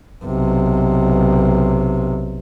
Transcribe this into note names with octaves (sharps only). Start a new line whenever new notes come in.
B1 C3